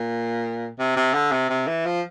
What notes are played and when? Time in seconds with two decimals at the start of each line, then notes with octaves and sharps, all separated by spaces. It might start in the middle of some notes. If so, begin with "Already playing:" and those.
Already playing: A#2
0.79 C3
0.96 C3
1.14 D3
1.32 C3
1.50 C3
1.67 E3
1.85 F3